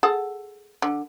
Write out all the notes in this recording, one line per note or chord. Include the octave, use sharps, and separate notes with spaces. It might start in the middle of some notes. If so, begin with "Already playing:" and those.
G#4 A4 F#5
D3